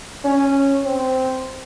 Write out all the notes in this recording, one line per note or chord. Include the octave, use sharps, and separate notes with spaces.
C#4
C4